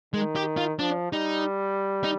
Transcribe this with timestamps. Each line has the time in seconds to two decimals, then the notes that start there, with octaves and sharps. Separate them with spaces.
0.14 D#3 G#3
0.36 G4
0.57 F4
0.79 F3 D4
1.12 G3 D#4
2.04 D#4